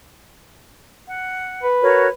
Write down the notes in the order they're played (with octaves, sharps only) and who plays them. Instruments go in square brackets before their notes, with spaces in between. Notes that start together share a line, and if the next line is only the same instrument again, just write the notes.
[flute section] F#5
[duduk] B4
[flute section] F#4 A#4 C#5